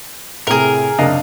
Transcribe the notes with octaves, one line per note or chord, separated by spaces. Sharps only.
A2 C3 G#4 A#4
F#1 C3 A#3 D4 D#5 F5